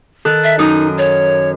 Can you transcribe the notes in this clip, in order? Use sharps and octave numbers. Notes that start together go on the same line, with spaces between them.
D#3 A4 F#6
E5
F#2 D#4 D#6
C#5